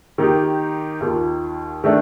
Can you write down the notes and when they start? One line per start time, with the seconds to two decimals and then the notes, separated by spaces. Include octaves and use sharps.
0.18 D#3 A#3 D#4 G4
1.01 D#2 D#3 A#3 F4
1.84 D#3 A3 D4